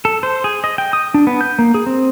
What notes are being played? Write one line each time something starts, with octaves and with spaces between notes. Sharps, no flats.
A4
C5
G#4
D#5
G5
D#6
D4
B3
G6
A#3
G#4
C4